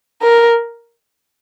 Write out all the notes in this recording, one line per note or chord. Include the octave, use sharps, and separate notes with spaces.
A#4